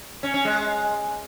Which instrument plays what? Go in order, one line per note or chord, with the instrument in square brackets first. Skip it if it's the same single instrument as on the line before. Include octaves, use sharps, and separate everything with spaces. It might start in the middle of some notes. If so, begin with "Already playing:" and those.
[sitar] C#4
C#4
G#3